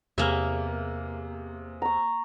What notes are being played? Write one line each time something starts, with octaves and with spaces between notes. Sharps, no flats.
E2 C3 A#3 G#4 E5 F6
A#5 C#6